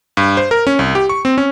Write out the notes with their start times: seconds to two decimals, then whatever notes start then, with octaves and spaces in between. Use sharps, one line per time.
0.17 G2
0.37 C5
0.51 A#4
0.67 C#4
0.79 C2
0.95 G4
1.09 C#6
1.25 C4
1.38 C#4